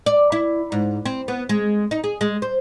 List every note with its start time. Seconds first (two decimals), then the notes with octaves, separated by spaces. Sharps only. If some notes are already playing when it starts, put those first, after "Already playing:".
0.06 D5
0.32 E4
0.72 G#2
1.06 C4
1.28 B3
1.49 G#3
1.91 D#4
2.04 G#4
2.21 G#3
2.42 C5